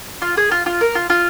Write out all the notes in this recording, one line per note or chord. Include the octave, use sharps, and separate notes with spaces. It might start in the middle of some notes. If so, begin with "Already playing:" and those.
F4
G#4
F4
F4
A#4
F4
F4